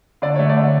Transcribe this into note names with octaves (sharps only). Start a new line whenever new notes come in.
D3 D5
A3 C#5
D5
D3